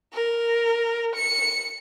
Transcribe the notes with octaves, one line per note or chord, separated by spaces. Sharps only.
A#4
C#7